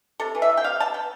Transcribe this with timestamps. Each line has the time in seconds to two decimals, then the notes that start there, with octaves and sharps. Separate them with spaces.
0.20 C3 A4
0.35 E3
0.42 E5
0.50 C3
0.57 G5
0.64 C3 F5
0.80 C3 A5
0.94 B3 G5